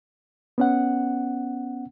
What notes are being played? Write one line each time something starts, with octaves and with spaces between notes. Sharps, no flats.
B3 C#4 F#5